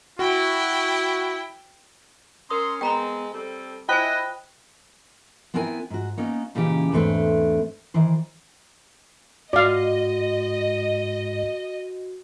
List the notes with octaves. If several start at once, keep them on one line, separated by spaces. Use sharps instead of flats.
E4 F#4 G5
C#4 A#4 A#5 C6 D#6
G#3 B3 C4 G5 A#5 B5
G3 C4 A4
E4 F4 C5 D#5 G5 G#5 B5 F#6
B3 C4 E4 A#4 G#5
G#2 F#4
A#3 B3 C#4 D#4
A#2 C#3 E3 C#4 D#4 G4
E2 G#2 A3 C4 D4 B4
D#3 E3 C5
G#2 F#4 D5 D#5 F5